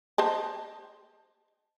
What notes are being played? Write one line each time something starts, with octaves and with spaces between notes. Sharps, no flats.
C5 D#5 A5